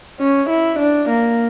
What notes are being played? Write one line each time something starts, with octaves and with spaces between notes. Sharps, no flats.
C#4
E4
D4
A#3